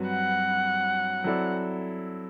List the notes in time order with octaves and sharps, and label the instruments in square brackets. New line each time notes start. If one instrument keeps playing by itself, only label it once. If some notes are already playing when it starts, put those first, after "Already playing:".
Already playing: [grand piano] G2 F#3 C4 F#4 B4
[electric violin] F#5
[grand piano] F#3 C4 E4 A4 D5